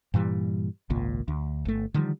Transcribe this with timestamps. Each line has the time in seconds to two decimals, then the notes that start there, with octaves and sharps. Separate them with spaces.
0.14 G2 A#2 E3 G3
0.90 G#1 C#2 A#2
1.28 D2
1.65 G1 A3
1.94 D3 D#3 F3 G3